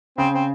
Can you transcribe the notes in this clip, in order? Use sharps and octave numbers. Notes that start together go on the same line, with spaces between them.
C#3 C4
C4